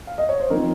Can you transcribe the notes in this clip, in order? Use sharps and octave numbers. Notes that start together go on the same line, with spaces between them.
F5
D#5
C#5
C5
F3 C4 D#4 A#4